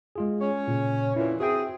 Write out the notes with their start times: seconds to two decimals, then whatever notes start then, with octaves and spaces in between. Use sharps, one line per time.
0.16 G#3 F4 G#4
0.41 C#4 C#5
0.68 A#2 C#3
1.16 F2 A#2 E3 C#4 E4
1.40 C4 F#4 G#4 E5 G5